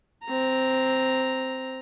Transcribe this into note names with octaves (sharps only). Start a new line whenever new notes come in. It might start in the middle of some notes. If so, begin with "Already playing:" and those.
C4 A#5